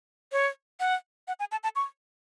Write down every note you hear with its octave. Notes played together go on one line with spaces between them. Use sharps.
C#5
F#5
F#5
G#5
A5
A5
C#6